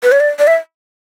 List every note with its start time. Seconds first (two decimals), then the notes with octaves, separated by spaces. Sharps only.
0.03 B4
0.12 C#5
0.20 D5
0.39 D5
0.47 E5